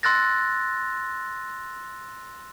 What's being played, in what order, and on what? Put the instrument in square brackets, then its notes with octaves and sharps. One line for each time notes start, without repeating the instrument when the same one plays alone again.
[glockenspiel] C6 E6 F#6 A6 A#6